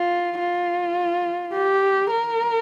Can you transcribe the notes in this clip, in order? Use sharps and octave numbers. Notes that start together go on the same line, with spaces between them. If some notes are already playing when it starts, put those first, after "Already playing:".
Already playing: F4
F4
G4
A#4